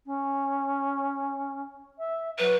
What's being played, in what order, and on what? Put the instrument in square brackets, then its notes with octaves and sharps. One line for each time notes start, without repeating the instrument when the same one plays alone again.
[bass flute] C#4
E5
[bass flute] F#3 [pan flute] B4